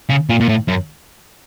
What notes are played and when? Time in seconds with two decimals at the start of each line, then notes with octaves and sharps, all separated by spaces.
0.09 C#3
0.30 A#2
0.40 A#2
0.49 A2
0.68 F#2